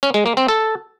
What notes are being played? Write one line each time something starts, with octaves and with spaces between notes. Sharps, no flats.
C#4
G#3
A#3
C4
A4